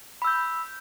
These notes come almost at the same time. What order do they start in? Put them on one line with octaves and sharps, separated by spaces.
B5 E6 G6